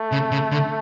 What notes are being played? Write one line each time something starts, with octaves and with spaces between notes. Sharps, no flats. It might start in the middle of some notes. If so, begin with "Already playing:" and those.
Already playing: A3
C#3
C#3
D3